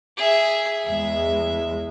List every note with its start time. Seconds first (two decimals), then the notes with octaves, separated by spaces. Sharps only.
0.17 G#4 E5
0.86 E2 G#3 E5